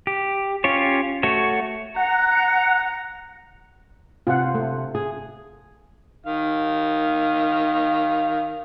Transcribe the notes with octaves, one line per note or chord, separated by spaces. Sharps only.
G4
C#4 F4 G4 C#5
A3 F#4 C#5
F#5 A#5
C3 F4 F#5
A3
G#4
D#3 F5